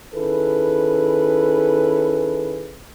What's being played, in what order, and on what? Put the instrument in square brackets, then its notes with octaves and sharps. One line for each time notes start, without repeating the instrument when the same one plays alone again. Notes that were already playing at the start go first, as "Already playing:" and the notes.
[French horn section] D#3 C#4 E4 G#4 A4 B4